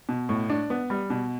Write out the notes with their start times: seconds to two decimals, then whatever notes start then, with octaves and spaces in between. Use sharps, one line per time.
0.09 B2
0.29 A2
0.50 D4
0.70 B3
0.90 G3
1.10 B2